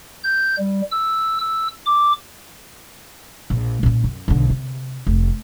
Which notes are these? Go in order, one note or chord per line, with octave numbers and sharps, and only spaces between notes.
G6
G3
E6
E6
D6
A#1
A#2 C#4
F#2
B1 D3
C3
F1